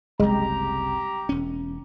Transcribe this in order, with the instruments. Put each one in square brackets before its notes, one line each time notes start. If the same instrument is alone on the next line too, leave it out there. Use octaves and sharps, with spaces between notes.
[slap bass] F#1 C2 [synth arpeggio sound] G#3 [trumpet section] G4 A#5
[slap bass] E1 C#4